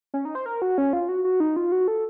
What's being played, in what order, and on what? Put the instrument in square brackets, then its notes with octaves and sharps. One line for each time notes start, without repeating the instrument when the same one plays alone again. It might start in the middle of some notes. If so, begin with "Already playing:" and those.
[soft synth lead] C#4
D#4
C5
A#4
F#4
C#4
F4
F#4
F#4
D#4
F4
F#4
A4